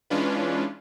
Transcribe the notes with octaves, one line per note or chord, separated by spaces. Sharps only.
E3 G#3 C#4 D4 F4 B4